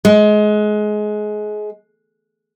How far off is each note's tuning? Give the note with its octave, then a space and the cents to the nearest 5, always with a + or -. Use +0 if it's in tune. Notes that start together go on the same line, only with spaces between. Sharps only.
G#3 +25